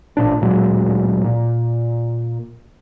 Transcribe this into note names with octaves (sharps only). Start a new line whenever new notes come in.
A1 A#2 D4
D1 A#2 F#3 G#3
A#2